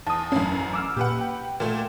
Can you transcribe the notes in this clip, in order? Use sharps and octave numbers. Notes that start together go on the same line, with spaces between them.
E2 A5 D#6
A1 F#2 C#4
D6 E6 F6
A#2 G4 B4 F#5
G5
A#2 A3